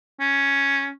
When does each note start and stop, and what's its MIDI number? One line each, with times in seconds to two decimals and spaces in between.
0.20 0.90 61